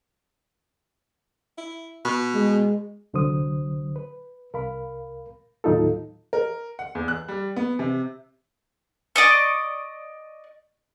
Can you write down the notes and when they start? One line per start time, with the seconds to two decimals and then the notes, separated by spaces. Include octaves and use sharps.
1.58 E4
2.05 B2
2.34 G#3
3.14 C2 D3 F#3 C5 D#6
3.96 B4
4.53 C2 A#4 F5 B5
5.64 D#2 A2 F#3 D#4 F4 A4
6.33 A#4
6.79 F#5
6.95 E2
7.08 F#6
7.28 G3
7.56 B3
7.79 C3
9.16 D5 D#5 C#6